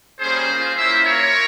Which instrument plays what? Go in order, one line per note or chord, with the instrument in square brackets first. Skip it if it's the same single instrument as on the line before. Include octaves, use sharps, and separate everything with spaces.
[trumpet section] G3 A#3 C#4 G#4 C5
A#3 F4
A#3 C#4 E4 C5 E5
A#3 F4 A#4 C#5